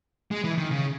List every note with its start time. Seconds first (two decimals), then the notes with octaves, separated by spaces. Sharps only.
0.31 G#3
0.44 E3
0.58 D#3
0.71 C#3